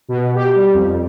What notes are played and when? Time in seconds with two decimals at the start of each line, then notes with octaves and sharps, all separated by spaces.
0.09 B2
0.35 G4
0.55 G3
0.74 F2